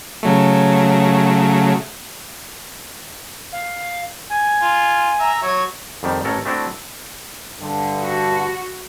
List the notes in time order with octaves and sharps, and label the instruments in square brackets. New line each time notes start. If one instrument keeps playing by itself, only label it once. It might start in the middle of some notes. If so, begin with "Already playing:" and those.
[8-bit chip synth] C#3 F#3 A3
[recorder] F5
G#5
[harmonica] F4
E5 A#5
F#3 C#5
[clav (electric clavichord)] F2 D#3 G3
A1 A4 A#4 C#5
A3 C4 D4 E4 F#4
[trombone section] G2 D3
[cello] F#4